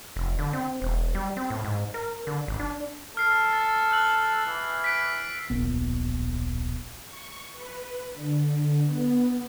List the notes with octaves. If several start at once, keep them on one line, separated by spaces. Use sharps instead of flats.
F1
D3
C4
E1
G3
C4
A2
G#2
A#4
D3
G#1
D4
A4 F6 C7
A6
E6 F#6 F#7
E3
B6 D7
D1 A#1 B3
C#6
B4
D3
B3